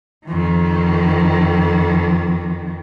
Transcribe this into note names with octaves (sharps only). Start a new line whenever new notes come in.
F2 D#3